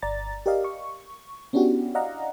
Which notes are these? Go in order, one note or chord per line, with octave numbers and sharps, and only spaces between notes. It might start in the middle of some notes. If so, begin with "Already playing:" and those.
G1 D5 A#5 A6
G4 A#4 D5 D#5 F5
C#6
B3 C#4 D4 E4 F#4 G4
D5 D#5 F5 F#5 A#5